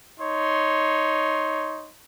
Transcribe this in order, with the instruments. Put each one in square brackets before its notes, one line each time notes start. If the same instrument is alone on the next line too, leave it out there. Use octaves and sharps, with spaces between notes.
[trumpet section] D#4 C#5 C6